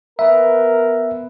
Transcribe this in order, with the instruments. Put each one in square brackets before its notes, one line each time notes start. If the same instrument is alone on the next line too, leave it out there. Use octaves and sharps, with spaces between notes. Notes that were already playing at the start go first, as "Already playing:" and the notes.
[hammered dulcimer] B3 B4 [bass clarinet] A#4 [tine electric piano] E5